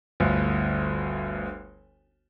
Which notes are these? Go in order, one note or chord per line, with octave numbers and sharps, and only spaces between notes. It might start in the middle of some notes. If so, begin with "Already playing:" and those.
G1 D2